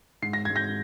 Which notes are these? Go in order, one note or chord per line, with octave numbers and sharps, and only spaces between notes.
G#2 C7
A#6
G#2 G#6
G6 A#6